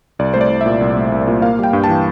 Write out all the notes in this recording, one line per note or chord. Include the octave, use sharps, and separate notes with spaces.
C2 D5
A3 C5
D5
C2
A#2 E5
C2
A3
C2
A#2
A#3 F5
G3 G5
G2
A5
E3